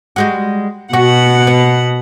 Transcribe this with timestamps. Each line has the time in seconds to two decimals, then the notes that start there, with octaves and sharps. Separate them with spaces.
0.16 G3 G#3 F#4
0.93 B2 F#4 F#5
1.47 B3